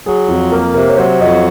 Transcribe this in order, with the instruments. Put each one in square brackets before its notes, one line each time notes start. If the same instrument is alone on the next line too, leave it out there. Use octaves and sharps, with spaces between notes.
[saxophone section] F#3 [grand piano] G#4
[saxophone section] F2 [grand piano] F4
[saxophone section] A#3 [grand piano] A#4
[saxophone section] C3 [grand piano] A#4
[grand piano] C#5
[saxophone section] F#3 [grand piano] C5
[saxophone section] F2 [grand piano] D#5